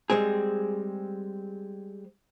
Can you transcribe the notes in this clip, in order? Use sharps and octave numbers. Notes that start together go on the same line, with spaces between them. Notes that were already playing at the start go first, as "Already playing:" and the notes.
G3 G#3 C4 G#4